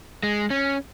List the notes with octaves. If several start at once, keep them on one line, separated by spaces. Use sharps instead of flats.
G#3
C#4